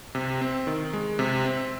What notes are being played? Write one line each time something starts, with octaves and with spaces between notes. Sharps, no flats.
C3
C4
D#3
G#3
C3
C4